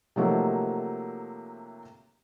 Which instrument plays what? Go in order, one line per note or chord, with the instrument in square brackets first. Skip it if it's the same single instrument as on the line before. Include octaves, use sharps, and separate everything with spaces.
[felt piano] C3 D#3 F3 F#3 A3 A#3